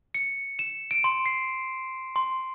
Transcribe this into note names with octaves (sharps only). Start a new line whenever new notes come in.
C#7
E7
D7
C6
C7
C6